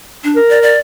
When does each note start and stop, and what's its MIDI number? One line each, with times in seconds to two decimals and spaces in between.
0.24 0.40 62
0.36 0.75 70
0.49 0.61 74
0.62 0.79 74